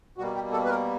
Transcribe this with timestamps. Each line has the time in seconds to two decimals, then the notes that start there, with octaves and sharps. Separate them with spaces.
0.17 B2 G3 A#3 F#4
0.35 G4
0.52 A4
0.65 B4
0.69 A#4